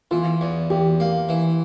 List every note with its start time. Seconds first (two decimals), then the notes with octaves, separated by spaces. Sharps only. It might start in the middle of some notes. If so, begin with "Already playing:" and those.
0.11 E3 F4
0.41 E2
0.70 E2 G4
1.00 A#3
1.29 E3